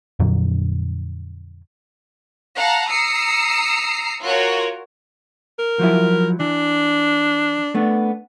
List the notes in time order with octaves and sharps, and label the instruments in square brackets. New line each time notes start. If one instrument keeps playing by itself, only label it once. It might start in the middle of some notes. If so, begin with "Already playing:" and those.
[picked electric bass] F2 A#2 D3 F#3
[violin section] F5 F#5 A5 A#5
A#5 D#6 E6 C7 C#7
F4 F#4 A#4 C#5
[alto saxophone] A#4
[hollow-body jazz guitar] F3 F#3 E4
[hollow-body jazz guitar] E3 [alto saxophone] D4
[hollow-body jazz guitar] A3 B3 D4